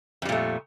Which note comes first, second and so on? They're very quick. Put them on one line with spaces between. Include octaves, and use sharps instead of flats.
F2 G3 A#2 A3